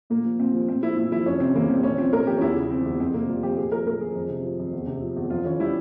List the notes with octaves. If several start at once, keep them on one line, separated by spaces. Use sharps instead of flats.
A#2 A#3
F3
A#2 C4
F3
A#2 C4
F3 E4
A#2 E4
F3 E4
F2 C#4
C3 C4
E3 A#3
G3 C4
A#2 C#4
F3 C4
A#2 A#4
F3 G4
C#4
E2 E4
C#3
F3 C4
E2
F2 C4
C3 A#3
G3 F4
F2 G4
A#2 G#4
F3 A#4
A#2 A#4
F3 G#4
F2
C3
F3
F2
E2
C3
F3
E2
F2 F4
E3 C#4
G3 E4